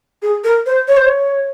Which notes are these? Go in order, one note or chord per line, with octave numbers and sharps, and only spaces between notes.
G#4
A#4
C5
C#5
C5
C#5